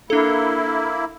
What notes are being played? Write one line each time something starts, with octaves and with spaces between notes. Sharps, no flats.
A#3 D4 E4 A4